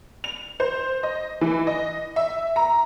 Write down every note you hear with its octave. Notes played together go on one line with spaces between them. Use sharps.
F7
C5
D#5
E3
D#5
E5
A#5